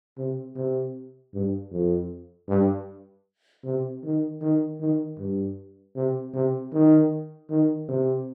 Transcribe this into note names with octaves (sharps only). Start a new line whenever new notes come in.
C3
C3
G2
F2
G2
C3
D#3
D#3
D#3
G2
C3
C3
D#3
D#3
C3